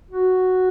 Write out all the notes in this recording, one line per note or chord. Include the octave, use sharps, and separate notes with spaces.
F#4